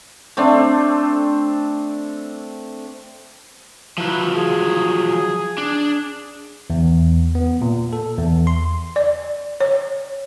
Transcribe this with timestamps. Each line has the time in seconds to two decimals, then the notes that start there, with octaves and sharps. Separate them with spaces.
0.37 A3 C4 D4
3.98 F3 F#3 E4 B4
4.36 G#4
5.58 D4
6.70 E2
7.35 B3
7.61 A#2
7.93 A4
8.18 E2
8.47 C6
8.96 D5
9.60 C#5